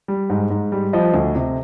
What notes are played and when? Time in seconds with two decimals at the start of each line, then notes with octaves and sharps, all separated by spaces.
0.08 G3
0.30 G#2
0.50 G#2
0.72 G3
0.93 F3 D#5
1.14 D2
1.36 C3